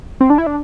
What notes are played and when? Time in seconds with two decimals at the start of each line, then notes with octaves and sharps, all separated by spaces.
0.20 C4
0.30 D4
0.38 E4
0.47 D4